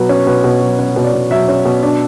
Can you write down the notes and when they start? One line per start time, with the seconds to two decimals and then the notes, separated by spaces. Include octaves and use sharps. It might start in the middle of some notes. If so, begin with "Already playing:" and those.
Already playing: B2 F#3 B4
0.09 C#4
0.27 B2 B4
0.44 B2
0.61 F#3
0.79 C#4 C#5
0.96 B2
1.04 D5
1.14 B2
1.31 F#3 E5
1.49 C#4
1.65 B2
1.83 D4